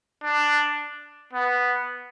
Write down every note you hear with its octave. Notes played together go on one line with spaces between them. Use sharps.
D4
B3